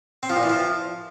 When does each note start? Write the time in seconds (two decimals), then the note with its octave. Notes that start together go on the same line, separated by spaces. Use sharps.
0.23 C4
0.30 F3
0.36 A#2
0.43 E3
0.50 F3